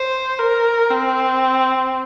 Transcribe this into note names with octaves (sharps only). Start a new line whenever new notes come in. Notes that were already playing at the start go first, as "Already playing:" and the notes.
Already playing: C5
A#4
C4